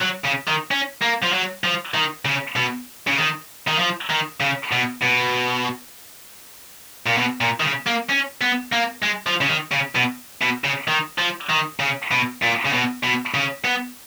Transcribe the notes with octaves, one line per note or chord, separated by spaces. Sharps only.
F#3
C#3
D#3
C#4
A#3
F3
F#3
F3
D#3
C#3
B2
C#3
D#3
D#3
F3
D#3
C#3
B2
B2
A#2
B2
A#2
D#3
C#3
A#3
C#4
B3
A#3
G#3
F3
C#3
D#3
C#3
B2
B2
C#3
D#3
F3
D#3
C#3
B2
A#2
C#3
B2
B2
C#3
B3